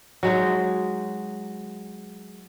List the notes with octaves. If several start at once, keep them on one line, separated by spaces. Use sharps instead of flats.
F#3 G#3 D#4